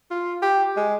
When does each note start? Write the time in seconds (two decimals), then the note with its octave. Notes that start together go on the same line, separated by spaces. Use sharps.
0.11 F4
0.42 G4
0.77 G#3